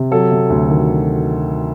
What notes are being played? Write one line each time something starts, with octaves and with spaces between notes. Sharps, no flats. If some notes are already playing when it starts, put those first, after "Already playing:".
Already playing: C3
F#3 A4
C3
D2
D#3